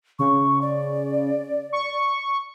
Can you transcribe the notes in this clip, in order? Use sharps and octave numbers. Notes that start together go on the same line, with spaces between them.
C#3 C#6
D5
C#6